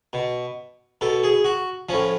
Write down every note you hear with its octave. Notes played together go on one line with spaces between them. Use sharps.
B2
B2 A4
G#4
F#4
A2 F3 C#4